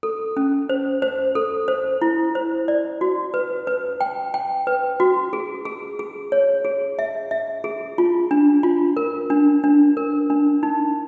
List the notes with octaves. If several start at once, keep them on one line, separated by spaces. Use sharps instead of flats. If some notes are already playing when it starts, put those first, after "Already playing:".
A4
C#4
C5
C5
A4
C5
E4
C5
D5
F#4
B4
B4
G5
G5
B4
F#4
G#4
G#4
G#4
C#5
G#4
E5
E5
G#4
F4
D4
F4
A#4
D4
D4
A#4
D4
D#4